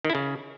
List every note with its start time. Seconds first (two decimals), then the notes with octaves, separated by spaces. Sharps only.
0.05 D#3
0.10 E4
0.15 C#3